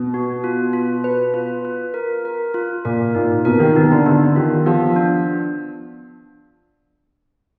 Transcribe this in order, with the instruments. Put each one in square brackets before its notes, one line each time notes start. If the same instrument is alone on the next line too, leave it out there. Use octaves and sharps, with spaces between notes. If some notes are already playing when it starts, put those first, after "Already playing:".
Already playing: [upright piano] B2
[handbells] F#4
F4
F4
B4
F4
F4
A#4
A#4
F4
[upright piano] A#2 [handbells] A#4
[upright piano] A#2 [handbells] D#4
[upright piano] B2 [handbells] A#4
[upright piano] D#3
[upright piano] B2 [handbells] D#4
[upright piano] D3
[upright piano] D3 [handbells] B3
[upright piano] D#3 [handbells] F4
[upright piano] F3 [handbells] B3
[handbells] D4